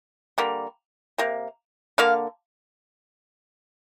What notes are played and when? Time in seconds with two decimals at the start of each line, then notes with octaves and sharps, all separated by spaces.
0.38 D3 G3 A#3
1.18 C3 A#3
1.98 D3 A#3 F5